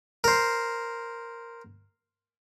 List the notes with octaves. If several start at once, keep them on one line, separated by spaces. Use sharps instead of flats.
A#4 C5